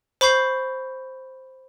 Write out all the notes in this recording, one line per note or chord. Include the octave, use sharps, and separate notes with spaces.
C5 B5 C#6 G6 C7